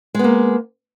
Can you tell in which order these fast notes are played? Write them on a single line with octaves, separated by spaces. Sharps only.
G#3 B3 A#3